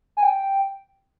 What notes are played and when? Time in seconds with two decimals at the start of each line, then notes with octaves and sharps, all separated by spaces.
0.17 G#5
0.23 G5